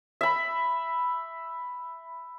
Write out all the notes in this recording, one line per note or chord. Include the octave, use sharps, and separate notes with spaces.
E5 B5